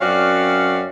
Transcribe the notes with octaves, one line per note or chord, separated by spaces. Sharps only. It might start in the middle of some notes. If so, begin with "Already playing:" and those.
F#2 C4 C#4 F#4 D5 F5